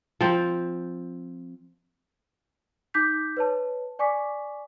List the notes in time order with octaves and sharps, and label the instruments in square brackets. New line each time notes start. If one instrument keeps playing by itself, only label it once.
[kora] F3 C4
[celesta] D#4 D6 G6 B6
B4 C#5 A5
D5 G#5 C#6 D6 B6